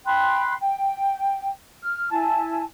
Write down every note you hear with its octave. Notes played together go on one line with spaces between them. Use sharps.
G5 B5 C6 F#6
G5
F6
E4 G#5 A5